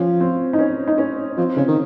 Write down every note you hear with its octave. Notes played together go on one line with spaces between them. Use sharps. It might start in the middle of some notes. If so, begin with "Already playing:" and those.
Already playing: F3 C#4
C4
D#4
C#4
D#4
C#4
F3 C4
C#3 C#4
D#3